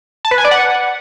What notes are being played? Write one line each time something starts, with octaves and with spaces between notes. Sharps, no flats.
A5
B4
G#5
D5
F#5